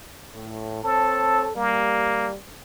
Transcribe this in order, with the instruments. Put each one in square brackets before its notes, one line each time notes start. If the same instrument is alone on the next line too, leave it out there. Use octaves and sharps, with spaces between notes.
[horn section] A2
[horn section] C4 C#5 A5 [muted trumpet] A4
[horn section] G3 [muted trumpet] A#3